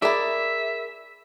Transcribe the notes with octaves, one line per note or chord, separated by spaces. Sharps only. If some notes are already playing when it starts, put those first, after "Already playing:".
E4 G#4 A#4 D5 E5